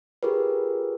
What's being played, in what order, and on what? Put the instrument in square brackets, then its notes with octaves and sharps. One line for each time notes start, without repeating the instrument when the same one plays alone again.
[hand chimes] F4 G4 G#4 A#4 B4